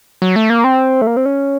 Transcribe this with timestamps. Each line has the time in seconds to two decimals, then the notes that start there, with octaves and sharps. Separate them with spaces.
0.22 F#3
0.36 A3
0.50 A#3
0.64 C4
1.01 A3
1.07 A#3
1.17 C4
1.26 C#4